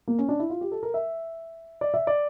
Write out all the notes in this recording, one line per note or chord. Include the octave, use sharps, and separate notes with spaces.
A#3
C#4
D4
E4
F4
G4
A4
A#4
E5
D5
E5
D5